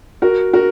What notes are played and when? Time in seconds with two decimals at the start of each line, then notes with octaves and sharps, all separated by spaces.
0.22 F#4 A#4
0.53 F#4 A#4